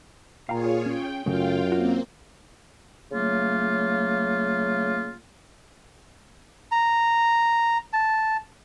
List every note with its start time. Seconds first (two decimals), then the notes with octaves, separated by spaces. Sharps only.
0.49 A#2 F4 G#4 C#5 F5 G5 A#5
0.86 C#4 G5
1.26 F#2 C#3 F#3 A3 F4 F5 G5
1.72 A#3 C4 F4 F#4
3.12 C#3 F#3 A3 A#3 F4
6.72 A#5
7.93 A5